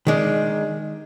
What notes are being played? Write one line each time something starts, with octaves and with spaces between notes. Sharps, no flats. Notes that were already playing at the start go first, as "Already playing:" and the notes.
D#3 G#3 D4